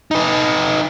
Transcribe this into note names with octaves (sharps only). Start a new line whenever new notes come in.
D#4 B4